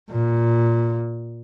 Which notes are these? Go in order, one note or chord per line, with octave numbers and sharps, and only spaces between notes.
A#2